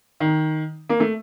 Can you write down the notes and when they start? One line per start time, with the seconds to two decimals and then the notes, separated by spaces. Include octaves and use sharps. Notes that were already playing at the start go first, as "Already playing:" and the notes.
0.20 D#3
0.89 A#3
1.00 A3